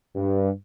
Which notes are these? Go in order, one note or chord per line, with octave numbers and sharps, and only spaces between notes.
G2